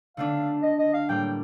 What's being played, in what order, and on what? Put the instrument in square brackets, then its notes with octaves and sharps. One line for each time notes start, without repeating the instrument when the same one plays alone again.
[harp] D3 A3 D4 [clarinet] F5
[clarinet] D#5
D#5
F5
[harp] A2 G3 A#3 [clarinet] G5